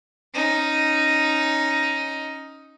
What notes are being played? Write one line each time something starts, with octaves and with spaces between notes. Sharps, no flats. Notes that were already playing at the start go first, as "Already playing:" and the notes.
C#4 D#4